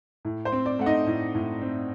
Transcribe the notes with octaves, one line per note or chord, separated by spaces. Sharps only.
A2
C5
C4
D5
A3 F#5
D#4 D#5
A2
A2
C4